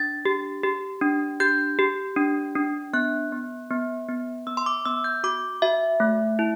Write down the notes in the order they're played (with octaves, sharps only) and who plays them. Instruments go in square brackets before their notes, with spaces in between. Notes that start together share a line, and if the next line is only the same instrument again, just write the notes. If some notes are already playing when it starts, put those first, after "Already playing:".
Already playing: [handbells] D4 A6
G4
G4
D4
G4 G6
G4
D4
D4
B3 F#6
B3
B3
B3
B3 E6
C6
D6
B3 E6
G6
F#4 D6
F#4 E5
A3
E4